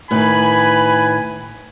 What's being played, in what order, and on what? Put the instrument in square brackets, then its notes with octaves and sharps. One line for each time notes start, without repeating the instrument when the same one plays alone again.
[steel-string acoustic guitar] A2 D#3 [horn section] B4 G#5 [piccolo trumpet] B5